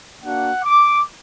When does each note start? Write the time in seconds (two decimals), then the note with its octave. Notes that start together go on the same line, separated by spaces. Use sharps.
0.23 A#3 D4 F#4 F#5
0.64 D6